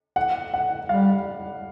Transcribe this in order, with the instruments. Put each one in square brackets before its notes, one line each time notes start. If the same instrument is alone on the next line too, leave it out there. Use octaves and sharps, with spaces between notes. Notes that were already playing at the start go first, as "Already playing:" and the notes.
[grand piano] F#5
F#5
[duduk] G3 [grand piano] F5